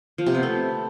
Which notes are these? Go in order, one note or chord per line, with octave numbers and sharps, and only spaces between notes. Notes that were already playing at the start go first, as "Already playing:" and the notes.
F3
C3
B3
A3